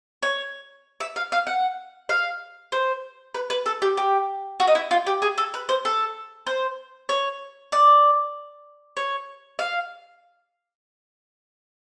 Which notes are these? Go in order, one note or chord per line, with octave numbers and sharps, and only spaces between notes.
C#5
E5
F5
F5
F#5
F5
C5
B4
B4
A4
G4
G4
F#4
D#4
E4
F4
G4
G#4
A4
B4
C5
A4
C5
C#5
D5
C#5
F5